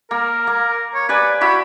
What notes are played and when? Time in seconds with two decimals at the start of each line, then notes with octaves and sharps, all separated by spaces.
0.11 A#3 A#4
0.47 A#3
0.95 C#5
1.09 G4 B4 D5 G#5
1.41 E4 F#4 B5